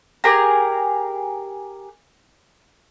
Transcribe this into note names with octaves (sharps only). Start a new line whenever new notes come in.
G4 G#4 A#4 A#5